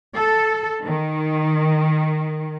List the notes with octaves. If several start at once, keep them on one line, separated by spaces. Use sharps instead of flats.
A4
D#3